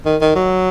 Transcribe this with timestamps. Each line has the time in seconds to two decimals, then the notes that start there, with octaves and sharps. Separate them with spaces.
0.06 D#3
0.21 D#3
0.35 F#3